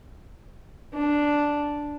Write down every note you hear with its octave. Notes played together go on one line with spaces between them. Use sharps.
D4